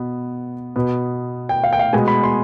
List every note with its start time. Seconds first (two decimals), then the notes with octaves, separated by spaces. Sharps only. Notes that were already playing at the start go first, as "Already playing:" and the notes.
Already playing: B2 B3
0.76 B2 B3
1.49 G5
1.64 F5
1.73 G5
1.79 F5
1.93 B2 G#3 B3 G#5
2.08 B5
2.23 C6